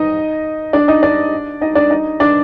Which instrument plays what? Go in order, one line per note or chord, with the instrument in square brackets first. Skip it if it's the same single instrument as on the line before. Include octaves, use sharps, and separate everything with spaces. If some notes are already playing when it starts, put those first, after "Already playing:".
Already playing: [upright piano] D#4 D#5
D4 D5
D#4 D#5
D4 D5
D#4 D#5
D4 D5
D#4 D#5
D4 D5